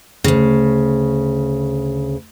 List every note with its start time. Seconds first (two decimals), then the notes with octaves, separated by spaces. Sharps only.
0.24 D2 C#3